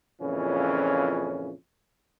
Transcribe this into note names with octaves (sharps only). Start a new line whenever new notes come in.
F2 A#2 C#3 E3 C#4